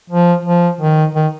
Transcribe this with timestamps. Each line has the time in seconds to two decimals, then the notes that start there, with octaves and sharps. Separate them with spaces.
0.10 F3
0.45 F3
0.81 D#3
1.15 D#3